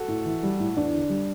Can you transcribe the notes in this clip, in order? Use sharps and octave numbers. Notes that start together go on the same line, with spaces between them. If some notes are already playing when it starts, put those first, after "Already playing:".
Already playing: F#4 A4
A2
E3
G3
A2
E2 D4
D3
G3